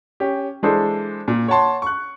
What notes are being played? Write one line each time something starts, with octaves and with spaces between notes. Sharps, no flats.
C#4 G4
E3 G#3 D4 G#4 A4 C5
A#2
C#5 F#5 A5 C6
C#6 F#6